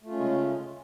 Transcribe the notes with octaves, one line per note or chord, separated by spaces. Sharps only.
C#3 G#3 A3 C#4 F4